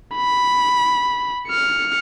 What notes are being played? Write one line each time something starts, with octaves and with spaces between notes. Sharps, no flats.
B5
F6 C#7